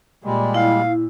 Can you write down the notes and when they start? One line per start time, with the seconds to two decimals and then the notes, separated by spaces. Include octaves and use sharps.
0.24 A#2 G3 G#3
0.54 E4 F5